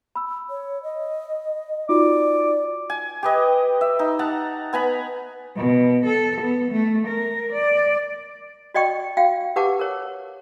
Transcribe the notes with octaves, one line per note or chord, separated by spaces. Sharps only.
B5 E6
C#5
D#5
D#4 F4 F#4 D5 D6
G#5
G4 B4 D#5
E5
D#4
F#5 A5 A#5
B3 G#5 A#5 B5
B2
A4
B3
A3
A#4
D5
F#4 D5 D#5 G5 C#6
F#4 F5 G5
G4 B4 F#5 A5 D6
A#4 C#5